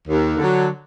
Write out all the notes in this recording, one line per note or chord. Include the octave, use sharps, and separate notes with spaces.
D#2
D3 F#3